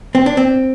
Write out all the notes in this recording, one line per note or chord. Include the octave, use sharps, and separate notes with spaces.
C4
D4
C4